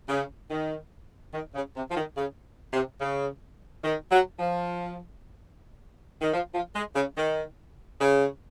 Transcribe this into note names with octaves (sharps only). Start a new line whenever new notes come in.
C#3
D#3
D#3
C#3
C3
F3
D#3
C#3
C3
C#3
D#3
F#3
F3
D#3
F3
F3
G#3
C#3
D#3
C#3